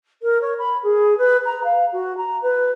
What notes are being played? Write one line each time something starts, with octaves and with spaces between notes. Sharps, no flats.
A#4
C#5
B5
G#4
B4
A#5
F5
F#4
A#5
B4